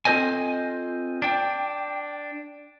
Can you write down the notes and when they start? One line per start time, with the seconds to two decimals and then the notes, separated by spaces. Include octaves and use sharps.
0.05 C4 F4 A4 C5 D#5 G#5
1.22 D4 G5